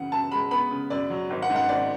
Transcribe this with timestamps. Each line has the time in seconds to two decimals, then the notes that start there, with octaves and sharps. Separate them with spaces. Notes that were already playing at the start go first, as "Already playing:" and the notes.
Already playing: F#2 C#3 E3 F#5
0.12 F#2 A5
0.32 G#3 B5
0.51 B3 B5
0.71 C#3
0.90 F#2 D5
1.10 F#3
1.30 G#1
1.42 F#5
1.50 G#2
1.56 F#5
1.69 G#1 D5